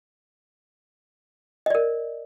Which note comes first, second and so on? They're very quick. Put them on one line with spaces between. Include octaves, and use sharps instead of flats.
D#5 D5 A#4